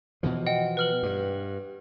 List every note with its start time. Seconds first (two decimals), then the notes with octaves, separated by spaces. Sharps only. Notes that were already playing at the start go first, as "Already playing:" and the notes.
0.23 B2 E3 F3
0.46 D#5 F#5 G5
0.77 B4 F6 F#7
1.03 G2